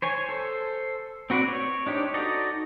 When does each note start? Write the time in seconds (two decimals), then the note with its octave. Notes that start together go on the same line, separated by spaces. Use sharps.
0.02 C5 C#5 G#5
0.29 A4 C5
1.30 C4 F#4 B4 C5 D5
1.45 C#5
1.86 D4 D#4 G4 C5 C#5
2.14 D#4 F#4 A4 D5 D#5